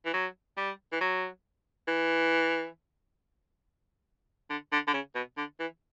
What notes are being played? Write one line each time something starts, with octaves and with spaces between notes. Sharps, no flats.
E3
F#3
G3
E3
F#3
E3
D3
D3
D3
C#3
B2
D3
E3